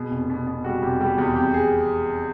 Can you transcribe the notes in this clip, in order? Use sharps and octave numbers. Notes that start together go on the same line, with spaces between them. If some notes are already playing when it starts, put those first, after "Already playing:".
Already playing: B2 G#4
F1
B2
B2
G3 F#4
F1 G4
G3 G4
E2 G4
F2 G4
G#4